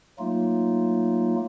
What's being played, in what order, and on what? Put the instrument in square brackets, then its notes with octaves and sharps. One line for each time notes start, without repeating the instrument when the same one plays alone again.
[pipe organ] F#3 A3 A#3 D#4 F4